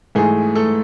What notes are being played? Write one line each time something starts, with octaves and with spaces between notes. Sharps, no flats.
G#2 E3 A3 G#4
A3 A4